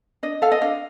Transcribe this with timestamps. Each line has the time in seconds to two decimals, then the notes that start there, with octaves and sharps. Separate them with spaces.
0.23 D4 D#5
0.42 A4 F5
0.52 D#5
0.61 D4 F5